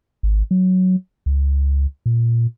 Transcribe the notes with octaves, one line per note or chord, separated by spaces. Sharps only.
G#1
F#3
C#2
A#2